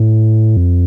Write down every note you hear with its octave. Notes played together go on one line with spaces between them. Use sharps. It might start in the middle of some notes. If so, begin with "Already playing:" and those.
Already playing: A2
F2